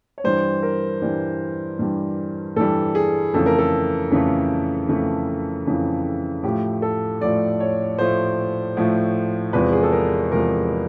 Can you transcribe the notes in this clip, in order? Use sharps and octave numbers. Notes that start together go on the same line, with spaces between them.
C#5
G2 E3 G3 C5
A#4
G2 E3 G3
G2 E3 G3
G2 E3 G3 A4
G#4
F2 C#3 E3 A3 A4
A#4
A4
F2 C#3 E3 A3
F2 C#3 E3 A3
F2 C#3 E3 A3
A2 F3 A3 G4
A4
A2 F3 A3 D5
C#5
A2 F3 A3 C5
A2 F3 A3
E2 C3 F3 G#3 B4
G#4
A4
A#4
E2 C3 F3 G#3 A#4